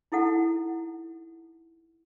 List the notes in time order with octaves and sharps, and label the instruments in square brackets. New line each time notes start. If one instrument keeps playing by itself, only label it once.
[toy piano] D#4 E4 A4 F#5